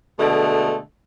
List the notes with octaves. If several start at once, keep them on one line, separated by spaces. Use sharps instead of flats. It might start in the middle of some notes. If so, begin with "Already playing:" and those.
B2 D3 G#3 A3